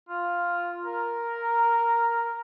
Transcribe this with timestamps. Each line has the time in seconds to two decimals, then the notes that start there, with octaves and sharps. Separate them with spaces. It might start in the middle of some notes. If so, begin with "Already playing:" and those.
0.09 F4
0.85 A#4